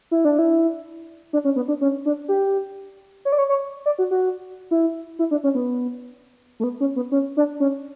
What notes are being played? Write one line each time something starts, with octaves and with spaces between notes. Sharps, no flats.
E4
D4
E4
D4
C#4
B3
D4
C#4
D4
G4
C#5
D5
C#5
C#5
D5
F#4
F#4
E4
E4
D4
C#4
B3
A3
B3
C#4
B3
C#4
D4
C#4